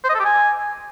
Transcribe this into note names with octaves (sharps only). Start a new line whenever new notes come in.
C5
D#5
A4
G4
G#5